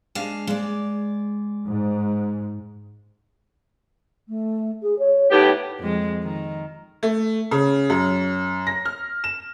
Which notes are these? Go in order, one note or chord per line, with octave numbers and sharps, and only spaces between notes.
G#3 D4 F5
G#3 D5
G#2
A3
G#4
C#5
A2 B3 D#4 G4
F2 G#3
D#3
A3
C#3
F#2
A#6
F6
E7